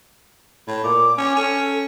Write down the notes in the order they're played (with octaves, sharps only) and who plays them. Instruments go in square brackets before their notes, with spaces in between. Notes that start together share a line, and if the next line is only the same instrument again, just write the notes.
[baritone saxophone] A2
[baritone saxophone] A#2 [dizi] D6
[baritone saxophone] C#4
[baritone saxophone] C#4 [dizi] A4